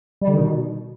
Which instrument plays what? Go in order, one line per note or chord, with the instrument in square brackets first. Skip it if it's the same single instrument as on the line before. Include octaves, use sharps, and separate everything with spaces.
[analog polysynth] G3
D3
D#3
B2